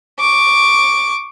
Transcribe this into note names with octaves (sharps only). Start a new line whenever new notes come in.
C#6 D6